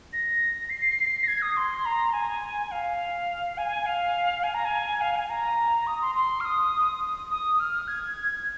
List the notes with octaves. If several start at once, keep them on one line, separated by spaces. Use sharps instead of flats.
A#6
C7
A#6
G#6
D#6
C6
A#5
G#5
G#5
F5
G#5
F5
G#5
A#5
G#5
F5
G#5
A#5
D#6
C6
C6
F6
D#6
D#6
F6
G#6